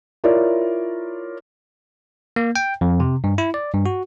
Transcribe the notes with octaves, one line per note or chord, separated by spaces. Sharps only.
E4 F4 A#4 C#5 D5
A#3
G5
F2
C3
G2
E4
D5
G2
F#4